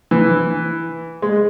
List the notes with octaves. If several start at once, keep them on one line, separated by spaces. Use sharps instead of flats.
E3
G#3